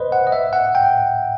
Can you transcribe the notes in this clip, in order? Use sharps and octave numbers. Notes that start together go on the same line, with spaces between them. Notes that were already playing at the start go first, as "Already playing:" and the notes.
Already playing: B4 C5 D#5
F#5
D#5
E5
F#5
G5